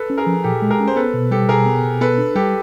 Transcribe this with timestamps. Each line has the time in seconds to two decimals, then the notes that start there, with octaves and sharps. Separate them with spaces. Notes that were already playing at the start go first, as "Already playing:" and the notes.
Already playing: A4 B4
0.10 C#4
0.18 G#4 A#4
0.26 F3
0.44 A#2 G4 A4
0.62 G#3
0.70 G#4 A#4
0.80 C#4
0.88 C5
0.96 B3 A4 B4
1.14 B2
1.31 G3 G4 A4
1.49 B2 G#4 A#4
1.66 B3
1.84 B2
2.01 B3 A4 B4
2.18 D4
2.35 G3 G4 A4